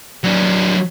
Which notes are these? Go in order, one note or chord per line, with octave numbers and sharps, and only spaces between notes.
F#3 D4